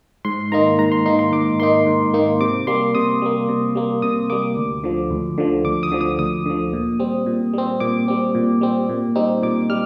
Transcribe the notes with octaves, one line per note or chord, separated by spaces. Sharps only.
G#2 C6
D#3 A#3 D#4 A#5
G#2 A#5
C6
D#3 A#3 D#4 C6
C6
G#2 D6
D#3 A#3 D#4 C6
G#2
D#3 A#3 D#4
C3 D6
G3 A#3 C6
C3 D#6
G3 A#3
C3
G3 A#3
C3 D#6
G3 A#3 D6
D2
D3 F3
D2
D3 F3
D2 D6
D#6
D3 F3
D#6
D2 D#6
D3 F3
A#2
G3 C4
A#2
G3 C4
A#2 D6
G3 C4
A#2
G3 C4
A#2
G3 C4 D#4
A#2 D6
G3 F6